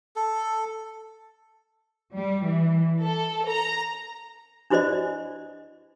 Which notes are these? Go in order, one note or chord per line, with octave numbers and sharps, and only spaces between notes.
A4
G3
E3
A4
A#5
D4 E4 F#4 C5 D5 D#5